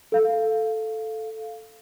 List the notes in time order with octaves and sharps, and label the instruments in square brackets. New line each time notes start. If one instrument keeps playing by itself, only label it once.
[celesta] A4 F5